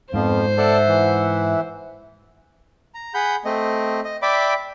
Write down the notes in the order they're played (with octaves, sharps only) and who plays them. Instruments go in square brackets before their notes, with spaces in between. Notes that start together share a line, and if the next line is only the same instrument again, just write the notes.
[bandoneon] F2 F3 [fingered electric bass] G#2 [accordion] B3 F5 [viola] C5
[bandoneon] A4 D5 A5 [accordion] E5 F#5
[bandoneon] E3
[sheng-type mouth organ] A#5
G#4 F#5 B5 G6
A3 C4 D#5
D#5
D5 E5 G5 B5 D6